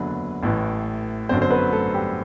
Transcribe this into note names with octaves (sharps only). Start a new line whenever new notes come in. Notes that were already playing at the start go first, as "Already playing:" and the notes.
Already playing: F#1 E2 D3 F#3 B3 B4
A1 A2 E3
G1 F#2 D3 F#3 C4 C5
C5
B3 B4
A3 A4
G3 G4